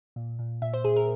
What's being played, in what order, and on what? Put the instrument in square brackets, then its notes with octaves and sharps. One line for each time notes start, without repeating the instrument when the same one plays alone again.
[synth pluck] A#2
A#2
A#2 E5
C5
A#2 G#4
A#4